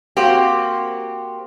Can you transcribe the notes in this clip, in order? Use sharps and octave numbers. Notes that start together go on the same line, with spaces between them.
A#3 C4 F#4 G4